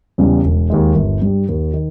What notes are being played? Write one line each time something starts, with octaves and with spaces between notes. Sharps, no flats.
E2 C#3 G3
E1
D#2 D#3 G#3
G1
G2 G3
D#2
D#3